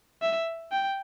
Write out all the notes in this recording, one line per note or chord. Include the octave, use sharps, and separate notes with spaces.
E5
G5